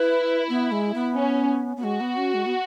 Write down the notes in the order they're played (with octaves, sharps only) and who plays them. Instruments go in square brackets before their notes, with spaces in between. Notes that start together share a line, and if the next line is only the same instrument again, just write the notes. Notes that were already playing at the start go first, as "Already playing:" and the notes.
Already playing: [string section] E4 [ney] B4
[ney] B3
G#3
B3
[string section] C#4
[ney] B3
[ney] G#3 [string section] F#4
[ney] B3
C#4
G#3
B3